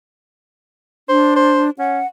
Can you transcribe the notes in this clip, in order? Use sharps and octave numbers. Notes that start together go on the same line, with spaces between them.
D4 C5
C5
C#4 F#5